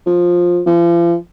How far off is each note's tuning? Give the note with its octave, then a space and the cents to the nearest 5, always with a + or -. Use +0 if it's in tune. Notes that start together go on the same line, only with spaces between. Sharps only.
F3 +10
F3 -40